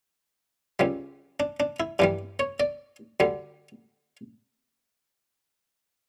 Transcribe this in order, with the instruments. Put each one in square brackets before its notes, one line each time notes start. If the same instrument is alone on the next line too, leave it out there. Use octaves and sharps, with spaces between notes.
[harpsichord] C#2 C#3 G3
D4
D4
E4
G2 E3 G3 D4
C#5
D5
D2 D3 G3